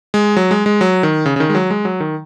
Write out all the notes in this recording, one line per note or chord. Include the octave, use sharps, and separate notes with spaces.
G#3
F#3
G#3
G#3
F#3
D#3
C#3
C#3
D#3
G#3
F#3
G#3
F#3
D#3